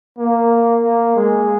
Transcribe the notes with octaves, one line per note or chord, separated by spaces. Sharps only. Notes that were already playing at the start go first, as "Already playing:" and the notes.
A#3
A#3
G#3